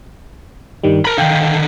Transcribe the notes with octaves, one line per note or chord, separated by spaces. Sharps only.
G2 D#3 G3
A#4 A#5 B5
D3 D#3 F5 G5